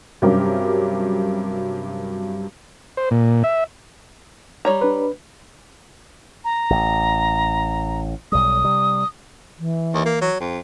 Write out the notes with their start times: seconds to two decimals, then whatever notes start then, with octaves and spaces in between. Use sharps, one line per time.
0.22 G2 C3 F#3 C#4 G4 A#4
2.97 C5
3.11 A#2
3.44 E5
4.65 G3 C#5 A#5
4.81 D4 B4
6.45 A#5
6.70 A1
8.32 B1 G3 D#6
8.64 C3 G3
9.59 E3
9.94 D#2
10.05 A#3
10.21 F#3
10.40 F2